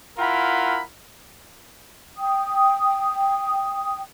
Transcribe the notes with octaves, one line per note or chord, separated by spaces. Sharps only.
E4 F4 A#4 F#5 B5
G5 D#6